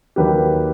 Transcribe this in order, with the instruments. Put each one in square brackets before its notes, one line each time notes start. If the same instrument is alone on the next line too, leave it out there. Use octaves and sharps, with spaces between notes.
[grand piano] D#2 D#3 F#3 G4 B4